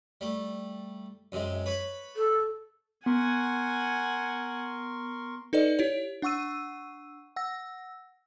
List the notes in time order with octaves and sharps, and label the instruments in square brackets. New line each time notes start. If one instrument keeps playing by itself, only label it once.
[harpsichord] G3 A3
F#2 C3 G#3
B4 C#5 B5
[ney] A4
[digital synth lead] B3 [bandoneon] A#4 C6 C#6 [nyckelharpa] F#5 G#5
[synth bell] D#4 A4 B4 D5 D#5
E4 G4 C#5
D4 F#5 C#6 E6 D#7
F#5 E6 A#6